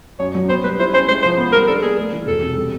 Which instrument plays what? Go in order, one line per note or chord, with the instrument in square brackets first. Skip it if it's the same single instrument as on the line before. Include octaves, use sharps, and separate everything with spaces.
[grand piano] F#2 [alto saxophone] C#5
[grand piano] F#3
[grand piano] B3 [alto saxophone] C5
[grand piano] G3 [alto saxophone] B4
[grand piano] E4 [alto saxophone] C5
[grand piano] C#4 [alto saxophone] C5
[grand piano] G#3 [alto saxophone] C5
[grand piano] F3 [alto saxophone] C5
[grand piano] B3
[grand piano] G3 [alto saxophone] A#4
[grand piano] D4 [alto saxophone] A4
[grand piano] A#3 [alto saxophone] G#4
[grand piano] A3
E3
[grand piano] E1 [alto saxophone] A4
[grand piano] C3
G3